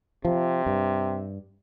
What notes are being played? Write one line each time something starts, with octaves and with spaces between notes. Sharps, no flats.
C3 F3
G2